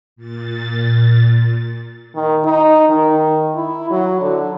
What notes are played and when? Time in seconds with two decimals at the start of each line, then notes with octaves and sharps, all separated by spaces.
0.16 A#2 A6
2.15 D#3
2.45 D#4
2.88 D#3
3.55 E4
3.90 F#3
4.21 D3